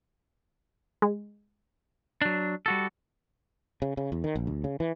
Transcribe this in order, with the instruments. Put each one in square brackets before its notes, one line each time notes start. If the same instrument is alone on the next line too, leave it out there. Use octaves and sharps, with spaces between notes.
[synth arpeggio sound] G#3
[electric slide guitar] F#3 D4
G3 F#4 A4
[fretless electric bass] C#3
C#3
E2
D#3
A#1
D2
C#3
E3